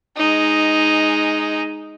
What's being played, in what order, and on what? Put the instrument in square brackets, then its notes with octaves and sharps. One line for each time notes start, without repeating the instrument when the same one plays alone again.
[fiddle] G#3 D#4